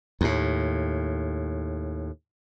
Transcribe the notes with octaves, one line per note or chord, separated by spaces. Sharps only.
D#2 A2